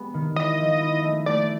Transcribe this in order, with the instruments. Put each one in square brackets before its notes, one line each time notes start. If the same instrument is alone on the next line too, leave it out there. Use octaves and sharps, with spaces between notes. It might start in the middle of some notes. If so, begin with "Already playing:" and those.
Already playing: [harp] G3 G#3 B3
D#3
[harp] E4 [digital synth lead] D#5
[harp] F3
E4
A3
[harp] A3 [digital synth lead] D5